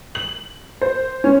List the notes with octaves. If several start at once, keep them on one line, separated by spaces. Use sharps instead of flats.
F#7
C5
C#4